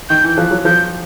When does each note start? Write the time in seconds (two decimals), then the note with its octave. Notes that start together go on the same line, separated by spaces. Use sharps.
0.09 D#3 G6
0.24 E3
0.29 G6
0.37 F3 F#6
0.51 F#3
0.65 F3 G6